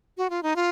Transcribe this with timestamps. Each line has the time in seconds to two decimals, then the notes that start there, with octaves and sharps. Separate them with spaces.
0.17 F#4
0.30 F4
0.43 D#4
0.56 F4